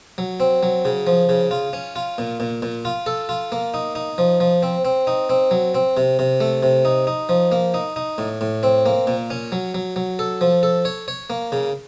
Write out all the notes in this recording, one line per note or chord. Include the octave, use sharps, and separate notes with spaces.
F#3
C4
F#3
C#3
F3
C#3
F4
C#4
F4
A#2
A#2
A#2
F4
A4
F4
A#3
D#4
D#4
F3
F3
C4
C4
D#4
C4
F#3
C4
C3
C3
A3
C3
D#4
D#4
F3
A#3
D#4
D#4
A2
A2
C4
A#3
A#2
C#4
F#3
F#3
F#3
A4
F3
A4
C#5
C#5
A#3
C#3